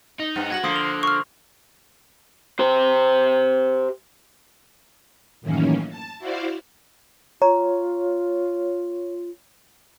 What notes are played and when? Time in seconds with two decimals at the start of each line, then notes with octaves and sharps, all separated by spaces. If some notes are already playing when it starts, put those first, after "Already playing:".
0.19 D#4
0.36 G2 B3
0.50 F#4 G#6 A#6 F#7
0.63 D3 F3 A#3 C6 D#6 C7
0.76 F7
1.03 C#6 F6
2.59 G4 C5
5.41 F#2 A2 D#3 E3 A#3 C#4
5.89 A5
6.19 E4 F#4 C5 D5 F5
7.42 F4 C#5 A#5